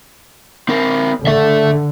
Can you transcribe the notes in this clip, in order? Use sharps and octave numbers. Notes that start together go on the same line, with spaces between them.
C4 A#4
D3 A4 E5